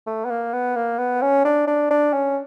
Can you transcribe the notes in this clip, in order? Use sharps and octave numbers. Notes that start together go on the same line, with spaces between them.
A3
B3
A#3
B3
A#3
B3
C#4
D4
D4
D4
C#4